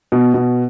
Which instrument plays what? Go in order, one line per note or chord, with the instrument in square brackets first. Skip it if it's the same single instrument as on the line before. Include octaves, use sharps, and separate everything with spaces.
[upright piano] B2
B2